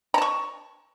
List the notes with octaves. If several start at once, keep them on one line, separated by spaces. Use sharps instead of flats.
A5 A#5 C#6